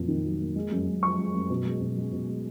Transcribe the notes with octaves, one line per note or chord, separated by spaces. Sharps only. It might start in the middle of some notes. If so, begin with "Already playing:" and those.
Already playing: F2 A#2 F#3 A#3
D#3
F#3
A#3
G#3
F#2
F#2
F3 C#6
G#3
F#2
B2
G#3
B2
G#3
B2
G#3